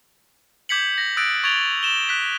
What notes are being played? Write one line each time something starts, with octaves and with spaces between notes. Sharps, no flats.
D6 G6 G#6 B6 C#7 F#7
A#6
D#6 E6 F#6 A6 A#6 D7
C#6 G#6 A6 D7 F7 G7
E7 G7
F#6 B6